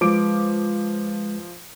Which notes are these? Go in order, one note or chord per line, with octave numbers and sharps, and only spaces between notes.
F3 G#3 B4 D6 D7